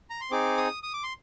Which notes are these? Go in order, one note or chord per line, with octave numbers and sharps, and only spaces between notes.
A#5
C6
C4 D#4 G#4 D6
D#6
D#6
D6
C6